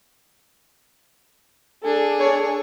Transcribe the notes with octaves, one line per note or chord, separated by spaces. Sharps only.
D4 G#4 A4
C#5